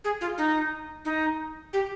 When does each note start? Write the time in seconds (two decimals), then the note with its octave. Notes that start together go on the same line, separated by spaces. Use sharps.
0.04 G#4
0.21 F4
0.38 D#4
1.05 D#4
1.73 G4